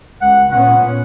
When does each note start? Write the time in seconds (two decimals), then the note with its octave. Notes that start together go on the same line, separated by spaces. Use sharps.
0.21 C#2 F#5
0.51 A#2 B3 C#4 F#5